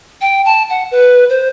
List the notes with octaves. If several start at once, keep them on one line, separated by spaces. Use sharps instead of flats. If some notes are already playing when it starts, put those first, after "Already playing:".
G5
A5
F#5
B4
C5